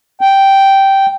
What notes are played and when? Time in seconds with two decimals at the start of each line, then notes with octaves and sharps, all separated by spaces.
0.21 G5